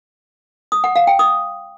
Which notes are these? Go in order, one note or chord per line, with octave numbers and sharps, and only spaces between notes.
D#6
F#5
F5
G5
D#6